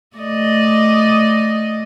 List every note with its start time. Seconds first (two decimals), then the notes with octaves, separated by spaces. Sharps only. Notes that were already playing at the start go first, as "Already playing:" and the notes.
0.16 A3 D5 D#5